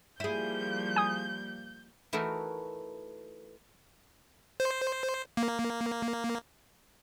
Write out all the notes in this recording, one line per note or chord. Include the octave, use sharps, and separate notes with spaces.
F3 G3 A#3 E4 G#4 G6
G#5 D#6
E3 A3 D#4 E4 F#4 A#4
C5
A#3